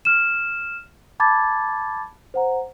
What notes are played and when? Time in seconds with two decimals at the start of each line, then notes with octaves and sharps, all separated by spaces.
0.05 F6 E7
1.20 A5 B5 D6 G#6 A6
2.34 C5 F#5 A#5